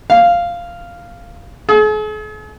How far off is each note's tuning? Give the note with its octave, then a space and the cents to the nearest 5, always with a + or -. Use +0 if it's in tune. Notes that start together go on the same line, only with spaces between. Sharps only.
F5 -5
G#4 +45